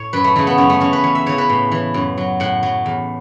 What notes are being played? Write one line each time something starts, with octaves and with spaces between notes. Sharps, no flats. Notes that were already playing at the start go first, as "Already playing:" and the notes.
Already playing: A2 C#5
F#2 B4
A3
C#3 E3 A3
B3
F#2 C#4
A3
E3 C#4
B4
E2 C#5
E5
C#3 E3 C#5
B4
A2
E3
F#2
F#3
A2 F#5
F#3
E2